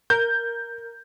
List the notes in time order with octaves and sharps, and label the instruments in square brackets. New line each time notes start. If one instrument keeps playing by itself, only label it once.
[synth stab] A#4 [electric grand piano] G6